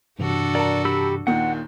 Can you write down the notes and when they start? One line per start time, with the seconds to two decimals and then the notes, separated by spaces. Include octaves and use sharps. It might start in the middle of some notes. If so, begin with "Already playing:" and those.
0.19 G2 C3 E3 D4 F#4 A4
0.55 A#4 D5 A5
0.85 G4 B5 E6
1.27 D#2 A#2 D#3 F#5